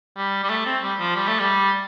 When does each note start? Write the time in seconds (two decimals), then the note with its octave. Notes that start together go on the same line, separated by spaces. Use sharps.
0.16 G3
0.44 G3
0.49 A3
0.66 C4
0.82 G3
0.99 F3
1.16 G3
1.27 A3
1.40 G3